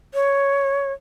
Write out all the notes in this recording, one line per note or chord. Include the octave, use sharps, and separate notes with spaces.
C#5